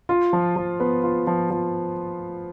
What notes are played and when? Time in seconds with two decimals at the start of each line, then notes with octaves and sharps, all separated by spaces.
0.09 F4
0.33 F3
0.56 F3
0.80 B3
1.04 F4
1.27 F3
1.50 F3